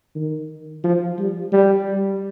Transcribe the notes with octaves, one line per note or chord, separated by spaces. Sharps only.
D#3
F3
G3
G3